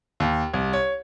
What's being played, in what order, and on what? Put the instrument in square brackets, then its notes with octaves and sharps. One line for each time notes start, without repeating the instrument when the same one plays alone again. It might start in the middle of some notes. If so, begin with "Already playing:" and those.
[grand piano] D#2
C2
C#5